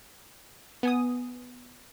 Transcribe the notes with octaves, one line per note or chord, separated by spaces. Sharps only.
B3 G#5 D#6